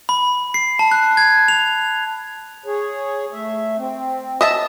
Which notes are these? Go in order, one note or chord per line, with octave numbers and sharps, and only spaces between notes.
B5
C7
A5
F#6
G#6
F7
G#4 C#5
A3 E5
C4
D#5 E5 A5